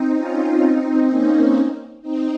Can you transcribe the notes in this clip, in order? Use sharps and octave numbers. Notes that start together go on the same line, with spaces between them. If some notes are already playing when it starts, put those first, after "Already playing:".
Already playing: C4 D#4
C#4 F4
C4 D#4
A#3 C#4
C4 D#4